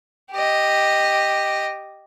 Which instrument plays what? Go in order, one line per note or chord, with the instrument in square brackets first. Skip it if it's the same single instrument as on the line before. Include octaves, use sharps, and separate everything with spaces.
[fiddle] G4 D#5